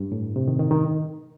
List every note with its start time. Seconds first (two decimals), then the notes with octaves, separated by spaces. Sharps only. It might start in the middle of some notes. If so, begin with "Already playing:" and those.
Already playing: G2
0.12 A2
0.36 C3
0.48 D#3
0.59 D#3
0.71 D#3